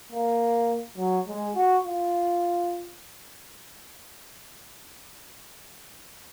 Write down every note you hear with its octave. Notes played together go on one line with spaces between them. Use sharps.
A#3
F#3
G#3
F#4
F4